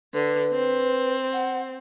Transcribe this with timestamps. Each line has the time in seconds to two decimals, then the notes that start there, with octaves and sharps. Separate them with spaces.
0.14 D3 B4
0.51 C4
1.33 F#5